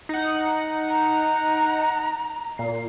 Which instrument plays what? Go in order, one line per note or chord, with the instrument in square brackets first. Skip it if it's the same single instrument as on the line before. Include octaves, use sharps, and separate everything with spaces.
[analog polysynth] D#4 F#5
[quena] A#5
[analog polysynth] A#2 C7